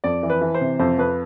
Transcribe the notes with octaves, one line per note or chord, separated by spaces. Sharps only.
F2 D5
E3
B4
E3
C5
C3
F2 C5
F2 B4